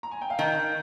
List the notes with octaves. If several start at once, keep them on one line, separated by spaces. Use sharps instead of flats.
A#5
G#5
G5
F5
D#3 D#4 D#5